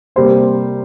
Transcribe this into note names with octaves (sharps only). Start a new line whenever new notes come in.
C3 G3 A#3 C5